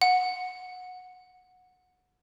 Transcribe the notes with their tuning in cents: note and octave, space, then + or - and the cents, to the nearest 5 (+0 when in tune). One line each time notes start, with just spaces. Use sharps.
F#5 -15